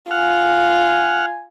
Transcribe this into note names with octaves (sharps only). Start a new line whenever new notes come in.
F4 F#5 G#5 F6